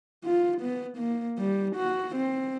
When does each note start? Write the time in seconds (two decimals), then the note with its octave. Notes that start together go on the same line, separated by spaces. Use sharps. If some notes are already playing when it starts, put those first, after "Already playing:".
0.24 F4
0.62 B3
0.97 A#3
1.39 G3
1.76 F#4
2.16 C4